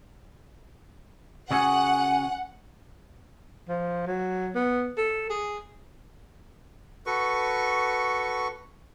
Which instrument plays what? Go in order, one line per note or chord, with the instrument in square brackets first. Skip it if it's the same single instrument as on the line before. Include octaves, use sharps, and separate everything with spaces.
[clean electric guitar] C#3 F#4 G#4 [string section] F#5 [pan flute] G#5
[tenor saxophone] F3
F#3
B3
A4
G#4
[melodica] F#4 A4 B4 C#6